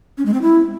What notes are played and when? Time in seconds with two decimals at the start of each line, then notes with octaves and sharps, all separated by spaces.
0.18 C#4
0.26 G#3
0.34 C4
0.42 E4